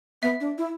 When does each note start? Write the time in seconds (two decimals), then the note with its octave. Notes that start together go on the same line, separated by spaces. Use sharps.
0.22 B3 E5
0.40 D4
0.58 E4